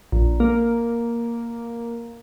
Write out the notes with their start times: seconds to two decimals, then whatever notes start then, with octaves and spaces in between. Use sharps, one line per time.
0.12 A#1
0.40 A#3